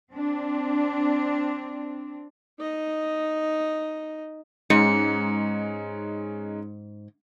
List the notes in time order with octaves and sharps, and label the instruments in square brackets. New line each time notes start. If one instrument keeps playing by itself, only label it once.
[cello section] C4 D4
[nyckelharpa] D#4 D#5
[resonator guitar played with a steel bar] G#2 [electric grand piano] G#3 C#4 D#4 [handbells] C#7